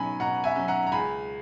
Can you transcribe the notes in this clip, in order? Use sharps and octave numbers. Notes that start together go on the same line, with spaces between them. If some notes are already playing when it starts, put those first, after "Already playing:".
Already playing: B2 F#3 C#4 G#5 B5
B2 F#5 A#5
E5 G#5
F#3 C#4
F#5 A#5
A#5
C#2 G#5 B5